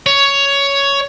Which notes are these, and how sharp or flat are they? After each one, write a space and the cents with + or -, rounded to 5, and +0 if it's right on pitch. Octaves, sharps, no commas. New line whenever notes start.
C#5 +10